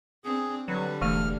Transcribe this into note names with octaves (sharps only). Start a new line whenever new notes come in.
C4 D4 G#4
D3 F#3 G3 B4
E1 E3 A3 F6